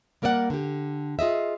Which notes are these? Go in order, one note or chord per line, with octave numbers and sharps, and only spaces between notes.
G3 A#3 A#4 D5 D#5 F#5
D3 G4
F4 G#4 D#5 E5